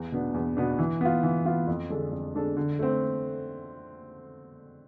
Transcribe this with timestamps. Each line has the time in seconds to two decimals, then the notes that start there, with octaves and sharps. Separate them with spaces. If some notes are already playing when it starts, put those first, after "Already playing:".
Already playing: E2
0.12 B2 B3 D4
0.34 E2
0.57 B2 B3 D4
0.79 E3
1.01 B3 F4
1.23 E3
1.45 B3 F4
1.67 F2
1.90 D3 G#3 D4 A4
2.12 F2
2.34 D3 G#3 D4 A4
2.57 D3
2.79 A3 C4